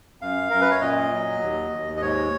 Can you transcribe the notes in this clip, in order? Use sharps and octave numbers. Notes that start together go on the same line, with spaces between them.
F#2 F5
F#2 A#4
B4
C#5
A#2 D#5
F#3
D#2
D#2
D#5
G#2 C#5